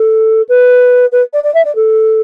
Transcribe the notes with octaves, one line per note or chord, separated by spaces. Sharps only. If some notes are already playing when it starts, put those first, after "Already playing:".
Already playing: A4
B4
B4
D5
D5
E5
D5
A4